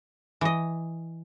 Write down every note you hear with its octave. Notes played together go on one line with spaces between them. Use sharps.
E3 D#5